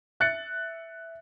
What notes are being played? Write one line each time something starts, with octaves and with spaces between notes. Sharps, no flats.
E5 F#6 A6 C#7